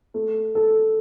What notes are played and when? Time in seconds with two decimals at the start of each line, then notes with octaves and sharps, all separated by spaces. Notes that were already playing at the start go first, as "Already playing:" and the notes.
0.14 A3
0.55 A4